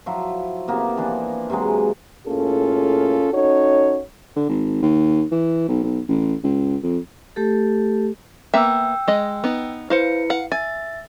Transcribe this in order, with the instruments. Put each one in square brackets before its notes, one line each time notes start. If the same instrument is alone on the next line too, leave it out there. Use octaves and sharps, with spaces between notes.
[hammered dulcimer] F3 F#3 E4
C3 A#3 B3
E3 F3 D4
C3 E3 F#3 G#3
[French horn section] A2 A#3 C#4 F4 G#4 A4
C#4 D#4 F#4 A4 C#5
[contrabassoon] D3
G#1
D#2
E3
B1
B1
A1
C#2
F2
[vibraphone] A3 G4 A4
[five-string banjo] A#3 B3 E5 [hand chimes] G5 E6
[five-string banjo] G#3 D#5
B3 D#4
[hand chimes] E4 B4 C#7 [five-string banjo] C5 F5
[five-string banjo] F5 F#5
[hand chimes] E5 A6 [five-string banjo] G#5